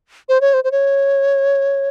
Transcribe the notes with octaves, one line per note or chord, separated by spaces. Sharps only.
C5
C#5
C5
C5
C#5